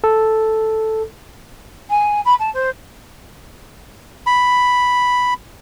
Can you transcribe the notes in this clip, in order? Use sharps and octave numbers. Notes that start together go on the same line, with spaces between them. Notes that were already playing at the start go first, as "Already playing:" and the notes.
A4
G#5
B5
A5
C5
B5